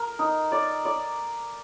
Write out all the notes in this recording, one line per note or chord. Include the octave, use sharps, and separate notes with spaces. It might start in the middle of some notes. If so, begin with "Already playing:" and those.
Already playing: A#4
D#4
D5
D5